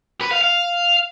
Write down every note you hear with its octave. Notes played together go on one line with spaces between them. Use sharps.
B4
F5
F5